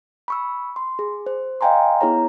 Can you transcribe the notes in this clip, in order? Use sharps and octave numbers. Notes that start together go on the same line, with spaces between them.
B5 C#6 E6
C6
G#4
C5
D#5 F5 G5 G#5 A#5 C6
B3 E4 G#4 C#5 A#5